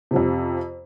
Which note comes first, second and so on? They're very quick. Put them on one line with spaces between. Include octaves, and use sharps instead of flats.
C3 F3 F2